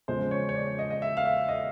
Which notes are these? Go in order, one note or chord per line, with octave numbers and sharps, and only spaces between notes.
E2 C#3 F3 G#3 C5
C#5
C#5
D5
D#5
D#5
E5
F5
E5
D#5